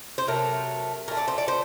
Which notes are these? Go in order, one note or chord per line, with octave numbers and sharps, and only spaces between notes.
C5
C3 F#3 A3 A#4
A#2 A3 A#4
D5
C5
D5
C5